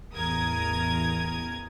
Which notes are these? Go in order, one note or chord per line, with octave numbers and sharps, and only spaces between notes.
A1 E2 A#4 D#6 G#6